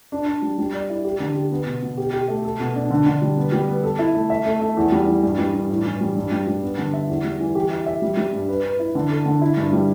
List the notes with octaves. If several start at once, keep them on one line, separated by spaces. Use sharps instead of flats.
D4
D4
G3
G3
D5
E4
G4
D3
G4
B3
B2
B2
G4
G4
A3
A4
B2
D4
D3
D3
G3
B3
G3
B3
A4
E4
A3
E5
A3
A3
E2
G3
E3
G2
G3
G2
A2
E3
G3
G2
G3
G3
B3
D3
E5
E2
G3
E3
G4
E5
E5
G3
G3
G2
B4
B4
E4
D3
A4
D3
E4
G2
G3